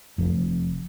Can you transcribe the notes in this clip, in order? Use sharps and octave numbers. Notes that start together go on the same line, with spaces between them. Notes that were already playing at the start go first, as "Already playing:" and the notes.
F1 F2